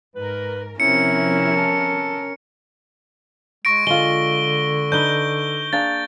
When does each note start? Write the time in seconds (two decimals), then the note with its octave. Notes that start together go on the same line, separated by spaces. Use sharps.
0.15 G#2 A#4 B4
0.80 C3 F3 C4 C#4 E4 A#4 C#7
1.57 A4
3.65 G#3 C#6 A#6 D7
3.87 D3 G#3 F4 D7 G7
4.92 D4 D#4 B4 G6 G7
5.73 A#3 D4 G#4 A6